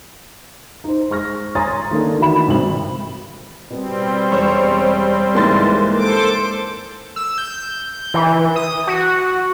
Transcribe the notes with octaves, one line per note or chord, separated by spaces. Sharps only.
D#4 C5
G#3 C#6 F6 A#6
C#5 G#5 A#5 C6 D#6 A6
D#3 A3 A#3 D4
D#3 E3 F#4 E5 B5 E7
G#1 C3 G3 C4 F#7
B2 G3 B3 C4
E1 C5 C#5
C#2 G#2 E3 A#3 C6 A6
A4 C5 D6
E6
G6
E3
D#6
F#4